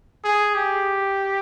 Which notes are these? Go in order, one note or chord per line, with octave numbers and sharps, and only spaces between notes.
G#4
G4